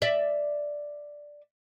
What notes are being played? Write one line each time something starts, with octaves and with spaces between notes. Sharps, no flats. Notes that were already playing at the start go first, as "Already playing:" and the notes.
D5 E5